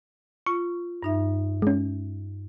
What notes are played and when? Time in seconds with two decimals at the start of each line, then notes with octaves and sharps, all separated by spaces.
0.46 F4 C#6
1.03 G2 D#4 E5
1.62 G#3 C#4